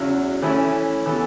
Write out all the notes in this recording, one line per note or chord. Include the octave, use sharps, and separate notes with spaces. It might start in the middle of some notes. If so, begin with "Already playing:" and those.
Already playing: E2 C#3 F#3
E3 A3 C#4 E4
E3 B3 A4